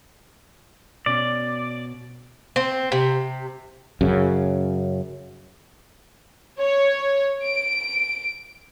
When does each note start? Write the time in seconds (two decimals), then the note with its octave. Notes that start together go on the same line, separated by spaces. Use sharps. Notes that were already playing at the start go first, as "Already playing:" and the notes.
1.06 B2 B3 C#4 D5
2.56 C4
2.92 C3
4.01 F#2 C#3
6.59 C#5
7.44 D7